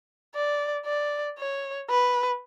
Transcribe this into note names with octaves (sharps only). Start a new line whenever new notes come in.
D5
D5
C#5
B4